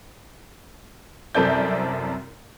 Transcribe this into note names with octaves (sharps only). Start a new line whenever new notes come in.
C2 F#2 C4 A4 D5 G6